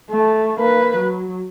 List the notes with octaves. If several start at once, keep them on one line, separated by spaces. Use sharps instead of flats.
A3
A#3 B4
F#3